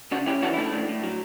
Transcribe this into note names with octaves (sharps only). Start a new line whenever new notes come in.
C#3 D4 F#4
C#4 E4 G4
E3 D4 F#4
E4
A3 D4
A2
A2
F#3